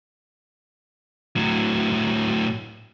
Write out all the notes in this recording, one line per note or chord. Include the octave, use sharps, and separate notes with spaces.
A2 F#3